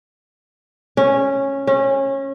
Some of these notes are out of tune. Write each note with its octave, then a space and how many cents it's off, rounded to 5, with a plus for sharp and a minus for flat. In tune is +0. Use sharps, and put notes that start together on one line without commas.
C#4 -10
C#4 -25